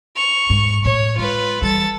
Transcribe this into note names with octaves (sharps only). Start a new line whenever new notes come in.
C#6 F7
G#2
A2 C#5
G#3 F4 B4
E3 G3 A4 A6